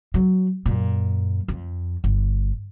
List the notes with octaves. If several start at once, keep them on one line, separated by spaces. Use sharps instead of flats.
F#3
F#2 A#2
F2
G1